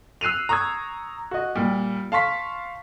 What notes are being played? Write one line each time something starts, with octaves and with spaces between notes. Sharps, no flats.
E6 F#6 C7 D#7 F7
A#5 C#6 D#6 E6 G#6
F#4 D#5
A#2 G3
F5 A5 C6 C#6 B6